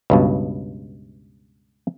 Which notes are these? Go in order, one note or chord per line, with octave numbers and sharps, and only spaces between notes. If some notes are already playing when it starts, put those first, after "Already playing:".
C#2 G2 B2